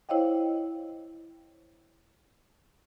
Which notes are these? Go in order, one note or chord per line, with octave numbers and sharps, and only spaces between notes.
E4 C5 C#5 D#5 F5 G5